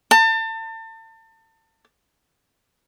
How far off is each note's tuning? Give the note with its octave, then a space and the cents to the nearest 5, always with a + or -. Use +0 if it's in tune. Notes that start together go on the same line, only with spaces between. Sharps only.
A5 +35